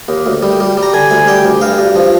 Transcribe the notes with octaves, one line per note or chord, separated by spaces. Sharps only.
D#2
D2
G3
G3
G3
A#5
D3 G#5
D2 G#5
G3 G5
D2
G2 F5
G2
F3